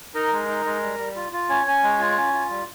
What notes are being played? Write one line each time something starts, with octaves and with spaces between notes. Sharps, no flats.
D#4 A#4
G#3
D#4
G#3
G3
G3
F4
F4
C#4 C#5
C#4
G#3
F4
C#4
F4
G3